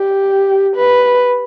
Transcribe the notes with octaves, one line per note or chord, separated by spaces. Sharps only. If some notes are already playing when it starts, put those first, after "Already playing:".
Already playing: G4
B4